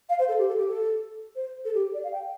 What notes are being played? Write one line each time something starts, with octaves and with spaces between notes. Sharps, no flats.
F5
C5
A4
G4
A4
G4
A4
C5
A4
G4
D5
F5
G5